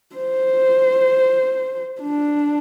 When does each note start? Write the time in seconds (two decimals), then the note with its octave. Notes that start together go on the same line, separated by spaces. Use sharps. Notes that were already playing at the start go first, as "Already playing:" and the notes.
0.16 C5
2.01 D4